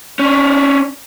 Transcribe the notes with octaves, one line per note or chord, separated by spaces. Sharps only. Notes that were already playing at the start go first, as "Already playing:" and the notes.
C#4 D4